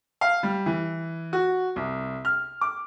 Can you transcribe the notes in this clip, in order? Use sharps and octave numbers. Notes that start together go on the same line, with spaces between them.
F5
G3
E3
F#4
C2
F6
D6